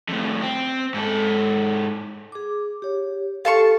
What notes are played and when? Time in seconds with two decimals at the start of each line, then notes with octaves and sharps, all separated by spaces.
0.08 F2 A2
0.41 C4
0.94 G#2 A4
2.32 G#4 D6
2.82 G4 C#5
3.45 G4 A4 F5 A5 C#6